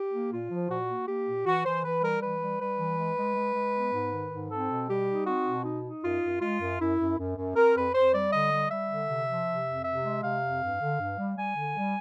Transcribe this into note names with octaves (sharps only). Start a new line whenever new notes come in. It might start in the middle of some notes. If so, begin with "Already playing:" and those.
Already playing: G4
A#3
A#2 F4
F3
A#2 F#4
A#3
A#3 G4
A#2
E3 F#4
E3 C5
E3 B4
G3 A#4
E3 B4
G3
G3 B4
E3
G#3
G#3
G#3
G#3
B3
G#2
D#3
G#2
C4 A4
B2
G3 G4
D#4
C4 F#4
B2
D#4
D#4
F#2 F4
F#2
G#3 F4
F#2
F#2 E4
F#2
F#2
F#2
C4 A#4
F2 B4
F2 C5
G3 D5
D3 D#5
G3
G3 E5
D3
C3
F3
C3
F2
C3 E5
G#3
C3 F5
F2
G2
D3
G2
G3
G3 G#5
D3
G3